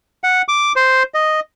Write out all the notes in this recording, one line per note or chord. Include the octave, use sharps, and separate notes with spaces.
F#5
D6
C5
D#5